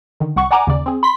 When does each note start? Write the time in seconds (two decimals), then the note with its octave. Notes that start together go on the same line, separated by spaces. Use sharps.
0.20 D3 D#3
0.36 C2 F#5 C#6
0.51 D5 F#5 G#5 A#5 D6
0.67 D#2 C#3 D5
0.86 C4 G#4
1.03 B5 C6 B6